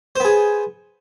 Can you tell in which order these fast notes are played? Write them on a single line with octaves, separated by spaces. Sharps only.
C5 B3 G#4